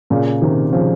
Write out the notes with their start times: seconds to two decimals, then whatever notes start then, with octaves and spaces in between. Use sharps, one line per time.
0.10 A#2 C#3
0.42 C3 D#3
0.73 C#3 F3